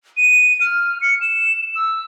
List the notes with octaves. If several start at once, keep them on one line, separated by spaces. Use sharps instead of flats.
D#7
F6
C#7
E7
E6